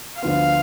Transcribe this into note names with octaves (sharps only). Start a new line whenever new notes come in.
D2 D3 F3 B3 F4 F5